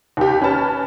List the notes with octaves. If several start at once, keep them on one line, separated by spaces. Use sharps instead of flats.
D#2 G4
C#4 B4 A5 F6